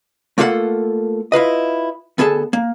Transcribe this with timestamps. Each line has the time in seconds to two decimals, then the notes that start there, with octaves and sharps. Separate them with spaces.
0.38 A3 A#3 F4 A4 B4 F#5
1.32 E4 F4 B4 D#5
2.18 D2 B3 G#4 A4 A5
2.53 A#3